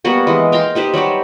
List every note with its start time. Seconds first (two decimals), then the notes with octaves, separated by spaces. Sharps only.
0.05 G3 A#3 B3 F#4
0.27 E3 G#3
0.52 F5 G5 A#5 C6
0.75 D#4 G4 B4 C5
0.93 F#3 G3 F#4 G4